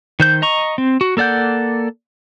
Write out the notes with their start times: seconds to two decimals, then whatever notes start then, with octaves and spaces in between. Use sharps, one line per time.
0.20 D#3 C5 G6
0.42 D#5 A#5 C#6
0.78 C4
1.01 F#4
1.17 A#3 A4 D5 F#5 G6